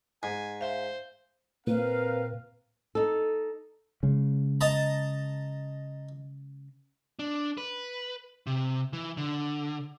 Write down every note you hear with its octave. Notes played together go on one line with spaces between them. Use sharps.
G#2 G#5
C5 E5 F5
A#2 C4 A#4 B4 F5
D#4 A4
C#3 G#3
D#5 A5 A#5
D4
B4
C3
E3
D3